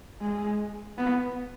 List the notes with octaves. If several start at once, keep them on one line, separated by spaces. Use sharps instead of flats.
G#3
B3